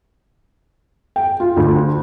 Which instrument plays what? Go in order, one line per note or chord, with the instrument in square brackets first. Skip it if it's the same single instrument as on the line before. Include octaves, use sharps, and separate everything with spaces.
[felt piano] G5
F4
D2